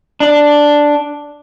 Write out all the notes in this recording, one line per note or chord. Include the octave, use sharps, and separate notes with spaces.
D4